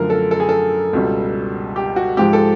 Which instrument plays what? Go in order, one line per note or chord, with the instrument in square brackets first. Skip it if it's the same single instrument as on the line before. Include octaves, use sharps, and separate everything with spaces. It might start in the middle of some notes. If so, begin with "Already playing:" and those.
Already playing: [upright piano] F#2 D3 F3 A3 A#4
A4
A4
G#4
A4
C#2 B2 G3
G4
F#4
G#2 F3 G#3 G4
A4